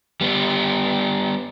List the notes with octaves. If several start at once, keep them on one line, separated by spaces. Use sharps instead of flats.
G3 B3